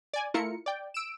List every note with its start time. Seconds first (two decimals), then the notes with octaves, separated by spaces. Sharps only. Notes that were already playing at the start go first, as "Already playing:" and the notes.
0.13 D5 G#5
0.34 A3 E4 F4 A#4 C#7
0.66 D5 G5
0.94 E6 D7 E7